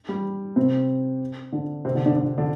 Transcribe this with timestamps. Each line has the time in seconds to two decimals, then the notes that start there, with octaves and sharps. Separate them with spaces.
0.09 G3
0.56 C3 C4
1.52 D3 D4
1.85 C3 C4
1.95 D3 D4
2.06 D3 D4
2.16 D3 D4
2.38 D3 D4